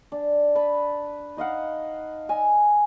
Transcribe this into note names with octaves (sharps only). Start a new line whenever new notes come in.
D4
B4 A5 B5
D#4 D#5 F5 F#5
D#5 G#5 E6